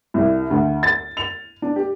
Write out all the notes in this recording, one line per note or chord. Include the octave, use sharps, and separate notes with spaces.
C2
D2
A6
F7
D4
G4